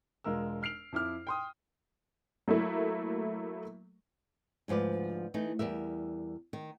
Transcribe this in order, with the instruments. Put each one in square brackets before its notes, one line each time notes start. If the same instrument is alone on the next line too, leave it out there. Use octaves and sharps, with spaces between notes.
[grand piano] E1 G#3 F4 A#4 E6
F6 C7 D7 F7
F2 E4 D6 F6
G5 C6 D#6
[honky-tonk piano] F#3 A3 A#3 E4
[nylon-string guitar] D2 G#2 F3 B4 D5
E3 A3 D#4
E2 G3 A#4 E5
D#3